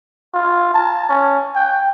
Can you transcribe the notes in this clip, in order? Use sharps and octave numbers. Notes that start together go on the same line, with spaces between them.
F4
A5
C#4
G5